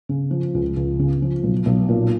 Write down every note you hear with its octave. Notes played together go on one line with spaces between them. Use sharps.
C#3
F3
C#2
C#2
C#3
F3
B1
B1
A#2